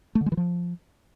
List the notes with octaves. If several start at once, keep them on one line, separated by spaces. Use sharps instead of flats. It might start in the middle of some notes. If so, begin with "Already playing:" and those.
A3
D3
G#3
E3
F3